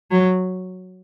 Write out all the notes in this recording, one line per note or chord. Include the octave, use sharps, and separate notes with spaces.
F#3